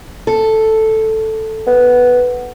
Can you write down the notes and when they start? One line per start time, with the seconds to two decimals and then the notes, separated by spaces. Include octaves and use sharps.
0.27 A4
1.67 B3